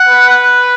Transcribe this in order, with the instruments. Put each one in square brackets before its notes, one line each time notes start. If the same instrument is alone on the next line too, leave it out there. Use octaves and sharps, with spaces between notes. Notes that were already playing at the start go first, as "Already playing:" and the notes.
Already playing: [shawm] F#5
[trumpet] B4